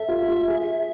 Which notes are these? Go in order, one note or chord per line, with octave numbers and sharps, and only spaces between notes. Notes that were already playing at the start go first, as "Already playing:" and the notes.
Already playing: A4 E5
F4
F4
G#4